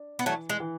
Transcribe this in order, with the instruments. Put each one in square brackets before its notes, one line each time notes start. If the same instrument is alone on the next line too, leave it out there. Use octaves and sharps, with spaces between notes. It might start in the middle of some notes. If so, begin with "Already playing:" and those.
Already playing: [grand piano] D4
[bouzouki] B3
[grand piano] E3 [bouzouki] F#3 A3
[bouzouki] G#3
[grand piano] E3